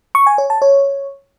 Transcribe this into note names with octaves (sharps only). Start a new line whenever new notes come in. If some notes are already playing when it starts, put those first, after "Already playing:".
C#6
G#5
C#5
A5
C#5